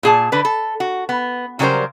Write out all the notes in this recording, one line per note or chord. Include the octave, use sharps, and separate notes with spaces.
A#2 G#4 A5
D3 B4 D5
A4
F#4
B3
C#3 F#3 G3 D4 A#4 C5